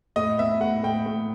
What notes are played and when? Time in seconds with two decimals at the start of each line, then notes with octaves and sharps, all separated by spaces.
0.16 A2 D#5
0.38 B3 E5
0.61 A2 F#5
0.83 A2 G5
1.06 A2